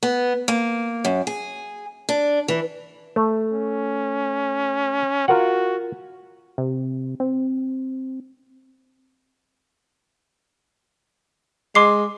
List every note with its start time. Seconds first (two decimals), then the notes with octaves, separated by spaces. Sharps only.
0.03 B3
0.48 A#3
1.05 F#2
1.27 G#4
2.09 D4
2.48 E3
3.16 A3
3.53 C#4
5.28 F4 F#4 A#4 F#5
6.58 C3
7.20 C4
11.75 G#3 C6 D6 C7